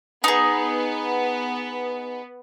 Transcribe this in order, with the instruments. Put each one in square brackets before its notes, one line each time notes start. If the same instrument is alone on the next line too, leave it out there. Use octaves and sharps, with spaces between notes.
[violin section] B3 [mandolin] D#4 G#4